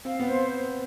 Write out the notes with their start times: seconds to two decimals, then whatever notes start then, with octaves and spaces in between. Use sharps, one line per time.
0.05 C4 F5
0.20 B3 C5